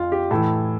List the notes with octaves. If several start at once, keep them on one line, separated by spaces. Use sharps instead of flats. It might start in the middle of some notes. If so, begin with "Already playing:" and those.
Already playing: F2 F4
G4
A2 E3 A4